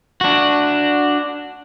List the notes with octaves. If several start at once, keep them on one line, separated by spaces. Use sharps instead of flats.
D4 F#4